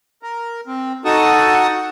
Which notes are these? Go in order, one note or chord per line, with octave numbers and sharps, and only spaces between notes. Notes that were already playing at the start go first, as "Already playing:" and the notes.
A#4
C4
D#4 F#4 A4 A5 C#6 D#6